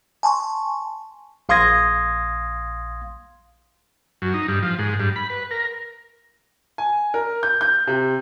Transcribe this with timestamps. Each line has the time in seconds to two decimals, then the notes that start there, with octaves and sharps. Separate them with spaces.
0.23 G#5 A5 C6 C#6
1.49 A#1 F5 C6 D#6 G#6 A#6
4.22 F#2
4.34 D#4
4.48 G2
4.63 F3
4.78 G#2
5.00 G2
5.16 B5
5.30 B4
5.51 A#4
6.78 G#5
7.14 A#4
7.43 G6
7.61 G6
7.87 C3